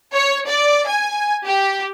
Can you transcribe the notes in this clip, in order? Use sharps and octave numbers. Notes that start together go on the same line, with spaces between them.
C#5
D5
G#5
G4